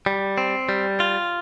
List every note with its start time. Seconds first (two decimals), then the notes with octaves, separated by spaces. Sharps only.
0.06 G3
0.38 C4
0.69 G3
1.00 F4